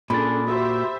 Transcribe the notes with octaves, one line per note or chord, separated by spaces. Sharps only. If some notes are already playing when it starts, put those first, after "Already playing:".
A#2 C#4 D4 G#4 A4 B5 A6
F#4 G4 C5 E5